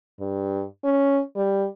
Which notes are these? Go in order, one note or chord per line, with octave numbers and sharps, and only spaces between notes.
G2
C#4
G3